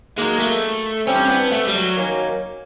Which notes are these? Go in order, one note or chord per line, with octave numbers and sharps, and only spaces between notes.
D#3 F#3 G#3 A#3
A3
G2 E3 G3 C4 C#4
B3
A3
G3
F#3
D#3 F#3 A#3 C#4